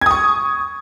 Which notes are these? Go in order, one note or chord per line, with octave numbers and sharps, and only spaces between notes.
C#6 D#6 G#6